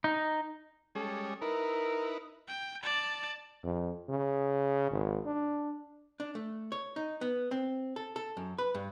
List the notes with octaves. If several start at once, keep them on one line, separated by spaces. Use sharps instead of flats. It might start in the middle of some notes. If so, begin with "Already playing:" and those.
D#4
G3 G#3 C#4 A4
D#4 E4 A#4 B4
G5
D5 A5
F2
C#3
G#1
D4
D4
A3
C#5
D#4
B3
C4
A4
A4
F#2
B4
G2